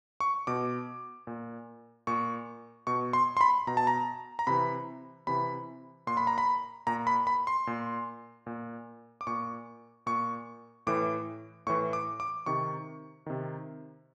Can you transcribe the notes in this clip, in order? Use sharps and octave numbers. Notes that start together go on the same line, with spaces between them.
C#6
B2 D6
A#2
A#2 C#6
B2 C#6
C6
C6
B5
B2 A#5
A5
A#5
A#5
C3 E3 B5
C3 E3 B5
A#2 C6
B5
A#5
B5
A#2 A#5
B5
B5
C6
A#2
A#2
D6
A#2 C#6
A#2 C#6
A2 E3 D6
A2 E3 C#6
D6
D6
C3 D#3 C#6
C3 D#3